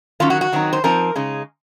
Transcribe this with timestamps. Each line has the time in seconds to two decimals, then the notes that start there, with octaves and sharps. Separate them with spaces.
0.20 D#3 F#3 C#4 F4
0.30 F#4
0.41 F#4
0.53 D#3 F#3 C4 D#4
0.73 C5
0.84 F3 C4 D#4 A#4
1.16 C#3 G#3 D#4